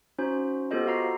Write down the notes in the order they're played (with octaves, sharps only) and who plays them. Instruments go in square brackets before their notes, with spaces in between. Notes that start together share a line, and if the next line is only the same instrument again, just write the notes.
[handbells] C#4 D#4 F#4 C5
B3 F4 G4 A4 C5 D#5
F#4 F5 A#5 C7